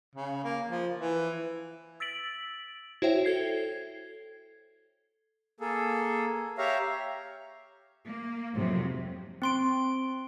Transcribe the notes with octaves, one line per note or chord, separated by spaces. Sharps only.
C#3
A#3
F3
E3
E6 A6 B6 D7 F#7
E4 F#4 C5 C#5 E5 G5
A4 G#6 C7
A#3 G#4 A4
G4 C#5 E5 F5 A#5
A#3
F2 G#2 C3 F#3
C4 C6 D7